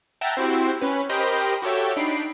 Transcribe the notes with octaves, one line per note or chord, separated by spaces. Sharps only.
E5 F#5 G5 A5 A#5
C4 E4 F#4 G4 C5
C#4 B4
G4 A#4 C5 D#5 G5 B5
F#4 G4 A4 C#5 E5
D4 D#4 B5 C7 D7